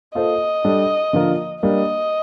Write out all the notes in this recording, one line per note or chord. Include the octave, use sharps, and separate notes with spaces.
A#3 F4 A4 C5 D#5
G3 D4 A4 D5
D3 F3 A#3 F4 A#4
G3 A#3 D4 D#5